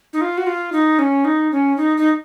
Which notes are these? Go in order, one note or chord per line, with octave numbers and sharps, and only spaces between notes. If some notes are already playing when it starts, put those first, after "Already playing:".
D#4
F4
F#4
F4
D#4
C#4
D#4
C#4
D#4
D#4